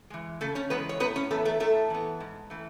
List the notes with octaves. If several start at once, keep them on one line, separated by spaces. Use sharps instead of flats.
E3 G#3
C#3 A3 A4
C#4 C#5
E3 G#3 B3 B4
C#5
A2 B3 B4
C#4 C#5
E3 A3 B3 A4
A3 A4
A2 A3 A4
E3 B3
G#2
E3 A3